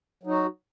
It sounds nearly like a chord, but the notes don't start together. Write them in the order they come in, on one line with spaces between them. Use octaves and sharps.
F#3 D#4 F#4